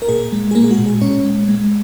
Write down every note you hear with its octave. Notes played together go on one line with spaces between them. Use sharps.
A#4
A#2 G#4
G#3
G#4
G#3 A#3 A#4
G#4
F#4
A#2
G#4
A#2 C#4 C#5
G#3
G#3